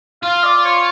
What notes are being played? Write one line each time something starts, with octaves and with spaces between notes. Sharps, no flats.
F4 F5
D5
C#5